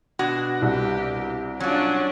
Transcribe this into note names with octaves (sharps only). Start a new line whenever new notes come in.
B2 D4 F#4
C2 G4
F#3 C#4 D4 F4